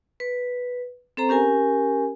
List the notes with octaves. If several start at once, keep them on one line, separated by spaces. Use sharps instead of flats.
B4
C4 A4 C5 A#5
C#4 G4 A#4 G#5